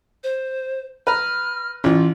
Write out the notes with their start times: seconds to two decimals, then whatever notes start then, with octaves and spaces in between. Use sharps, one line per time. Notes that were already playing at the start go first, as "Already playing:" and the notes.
0.24 C5
1.07 B4 A#5 F6
1.84 A1 E3 C#4 F4